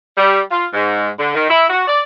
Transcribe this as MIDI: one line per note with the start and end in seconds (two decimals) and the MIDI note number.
0.17 0.40 55
0.51 0.66 65
0.74 1.09 44
1.19 1.32 50
1.35 1.48 51
1.49 1.67 64
1.69 1.84 66
1.87 2.03 74